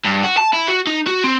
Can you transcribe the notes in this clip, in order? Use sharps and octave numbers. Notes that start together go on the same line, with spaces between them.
G2
F#4
A5
E4
F#4
D#4
F#4
C4